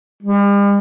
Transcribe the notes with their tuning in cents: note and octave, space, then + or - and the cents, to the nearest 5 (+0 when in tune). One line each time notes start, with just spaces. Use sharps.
G3 +45